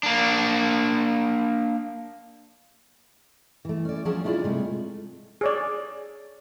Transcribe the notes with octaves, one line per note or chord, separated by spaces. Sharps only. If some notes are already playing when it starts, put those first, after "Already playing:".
A#3 D4
E3 A3
C#4 D5
F3 F#3 A3 C#4 G#4 A5
D4 E4 F4 G4 G#4 D5
C3 G#3 A3
G#4 C#5 D5